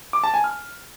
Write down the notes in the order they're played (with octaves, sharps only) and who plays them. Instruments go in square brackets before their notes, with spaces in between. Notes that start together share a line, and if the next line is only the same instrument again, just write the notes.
[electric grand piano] D6
A5
G#5
F6